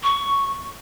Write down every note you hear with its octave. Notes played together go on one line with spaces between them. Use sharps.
C#6